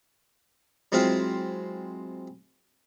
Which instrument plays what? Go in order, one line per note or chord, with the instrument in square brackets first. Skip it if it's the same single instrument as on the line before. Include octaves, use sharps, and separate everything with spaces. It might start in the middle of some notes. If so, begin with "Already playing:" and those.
[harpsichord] F#3 G#3 C4 E4 F4